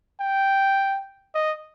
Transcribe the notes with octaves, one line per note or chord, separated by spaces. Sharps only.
G5
D#5